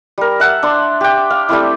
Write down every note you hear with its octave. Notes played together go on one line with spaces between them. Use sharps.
G3 A#4
E5 F#5 A5
D4 C6
G4 G5
F5
G3 A3 C4 E4